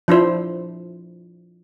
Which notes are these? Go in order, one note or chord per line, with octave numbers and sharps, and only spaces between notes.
F3 D4 E4 C5